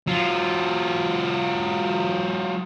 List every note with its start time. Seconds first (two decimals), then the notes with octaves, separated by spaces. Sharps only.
0.07 F#3 F4